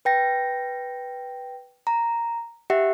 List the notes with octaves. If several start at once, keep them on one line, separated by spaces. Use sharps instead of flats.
B4 G5 A#6
A#5
G4 E5 F#5